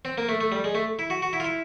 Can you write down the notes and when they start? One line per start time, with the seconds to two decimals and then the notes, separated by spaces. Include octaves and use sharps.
0.05 C4
0.18 A#3
0.29 A3
0.41 A3
0.52 G3
0.64 G#3
0.75 A3
0.99 E4
1.10 F#4
1.22 F#4
1.33 E4
1.40 F4
1.45 E4